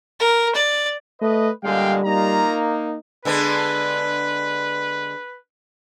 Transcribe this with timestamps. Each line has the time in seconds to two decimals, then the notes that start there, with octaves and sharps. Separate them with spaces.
0.20 A#4
0.55 D5
1.21 A3 B4 D#5
1.64 A#2 D3 G3 G#3 F5 G5
2.05 A#3 D#4 F4 A#5
3.25 D3 G#3 B3 B4